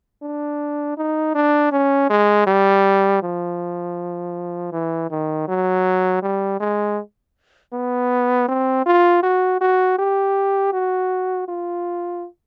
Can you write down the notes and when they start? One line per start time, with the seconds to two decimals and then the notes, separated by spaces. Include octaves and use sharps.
0.23 D4
0.97 D#4
1.35 D4
1.72 C#4
2.10 G#3
2.47 G3
3.23 F3
4.72 E3
5.11 D#3
5.48 F#3
6.22 G3
6.60 G#3
7.73 B3
8.48 C4
8.86 F4
9.23 F#4
9.61 F#4
9.99 G4
10.73 F#4
11.48 F4